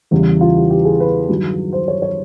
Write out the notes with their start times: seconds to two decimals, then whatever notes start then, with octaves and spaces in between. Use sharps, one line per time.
0.11 E2 C#3 E3 G3
0.41 F4
0.55 G4
0.70 G4
0.85 G#4
1.00 B4
1.29 G2 D#3 F#3
1.73 C5
1.88 C#5
2.02 C#5